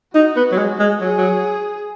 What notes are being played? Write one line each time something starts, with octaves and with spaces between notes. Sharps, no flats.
D#4 F#4
B3
F#3
G#3
G#3
F#3 G#4
F#3